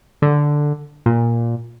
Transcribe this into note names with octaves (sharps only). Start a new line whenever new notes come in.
D3
A#2